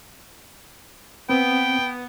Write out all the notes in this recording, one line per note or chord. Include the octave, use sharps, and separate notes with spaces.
B3 C4 G5